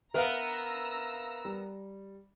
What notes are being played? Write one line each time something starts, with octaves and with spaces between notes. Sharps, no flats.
B3 A#4 E5 F5 A#5 E6
G3